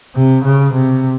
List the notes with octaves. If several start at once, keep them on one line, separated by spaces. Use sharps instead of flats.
C3
C#3
C3